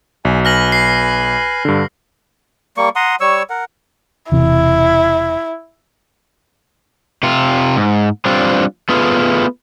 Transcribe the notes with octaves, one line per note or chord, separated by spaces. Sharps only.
B1 G#5
B4 G#5 F6 A#6 F#7
C7
G2 D3
G3 A#3 C#6
F#5 A#5 C6 D#6
G3 C#5 C#6 E6
A#4 F#5
E1 C3 E3 E4
C3 F4
G#2
G3 C4 D4 F4
A3 B3 F4 G#4